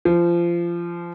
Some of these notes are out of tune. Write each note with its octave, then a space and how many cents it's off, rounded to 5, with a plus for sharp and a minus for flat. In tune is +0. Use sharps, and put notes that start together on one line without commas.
F3 -25